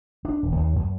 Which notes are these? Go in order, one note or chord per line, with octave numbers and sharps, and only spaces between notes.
D4
D#1
D#2
F#2